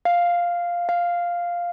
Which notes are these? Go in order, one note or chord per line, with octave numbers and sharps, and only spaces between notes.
F5
F5